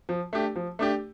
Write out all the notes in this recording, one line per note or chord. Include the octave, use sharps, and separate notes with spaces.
F3
A3 D4 G4
F3
A3 D4 G4